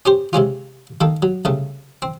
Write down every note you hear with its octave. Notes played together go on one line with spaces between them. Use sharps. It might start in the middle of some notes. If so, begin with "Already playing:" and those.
C#4 G4 C5
C3 G#3 C#4 F4
D#3 A#3 A4
F#3
C2 C#3 A3
C4